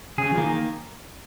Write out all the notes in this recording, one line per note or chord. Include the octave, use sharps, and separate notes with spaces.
C#3 G#4
F3
D#3 A#3